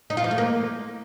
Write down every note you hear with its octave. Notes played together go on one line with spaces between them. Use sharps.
D#4
F4
F3
A3
A#3